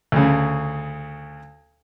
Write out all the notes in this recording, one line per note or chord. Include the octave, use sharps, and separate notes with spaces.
D2 C#3